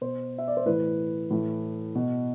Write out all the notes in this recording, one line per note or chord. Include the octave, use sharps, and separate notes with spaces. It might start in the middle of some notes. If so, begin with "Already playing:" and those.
B2 C5
E5
D5
C5
A2 E3 B4
A2 E3
B2